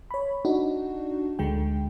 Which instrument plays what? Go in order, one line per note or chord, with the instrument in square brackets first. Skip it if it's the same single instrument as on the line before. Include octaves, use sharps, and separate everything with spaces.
[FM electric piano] C#5 B5
D4 D#4 F#4
D2 D3 G#3 G5